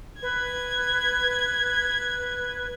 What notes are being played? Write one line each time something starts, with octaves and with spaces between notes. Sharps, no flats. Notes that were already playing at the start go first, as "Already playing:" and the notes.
B4 G#6